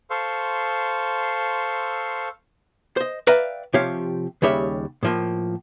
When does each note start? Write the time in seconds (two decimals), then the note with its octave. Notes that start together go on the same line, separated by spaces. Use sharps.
0.10 A4 C5 F5 C6 C#6
2.97 C5 D#5
3.27 B4 D5 E5 F5 G5 A#5
3.74 C3 F3 G4 C#5 F5
4.42 D#2 C#3 G3 C#5 E5
5.03 A2 F3 A#3